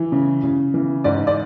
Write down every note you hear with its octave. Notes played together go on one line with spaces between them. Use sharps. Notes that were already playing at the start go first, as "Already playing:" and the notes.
Already playing: E3
C#3
C#3
E3
G#2 D5
D5